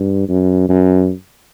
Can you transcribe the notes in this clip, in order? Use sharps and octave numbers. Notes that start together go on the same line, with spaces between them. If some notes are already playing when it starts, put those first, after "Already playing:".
Already playing: G2
F#2
F#2